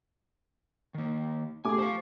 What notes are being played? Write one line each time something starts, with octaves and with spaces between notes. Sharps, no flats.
D#3 A#3
A3 G4 G#4 G#5 D6
C5 F5 C#6